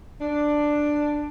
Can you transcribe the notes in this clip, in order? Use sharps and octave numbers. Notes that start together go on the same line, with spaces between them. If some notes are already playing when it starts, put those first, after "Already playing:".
D4